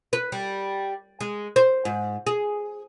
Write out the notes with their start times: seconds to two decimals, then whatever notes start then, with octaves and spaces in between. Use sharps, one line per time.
0.13 B4
0.32 G3
1.21 G#3
1.56 C5
1.85 G#2
2.27 G#4